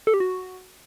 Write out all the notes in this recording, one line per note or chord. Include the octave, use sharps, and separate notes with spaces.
A4
G4
F#4